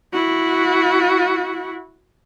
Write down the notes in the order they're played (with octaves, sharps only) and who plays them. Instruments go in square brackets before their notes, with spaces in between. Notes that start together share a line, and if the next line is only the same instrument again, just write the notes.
[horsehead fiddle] E4 F#4